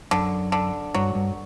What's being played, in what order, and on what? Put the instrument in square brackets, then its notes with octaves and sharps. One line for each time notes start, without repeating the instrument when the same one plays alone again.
[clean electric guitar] F#2 [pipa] D3
[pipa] D3
[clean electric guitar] G2 [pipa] F#3
[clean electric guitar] G2